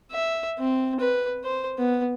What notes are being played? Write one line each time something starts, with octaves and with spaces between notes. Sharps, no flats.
E5
C4
B4
C5
B3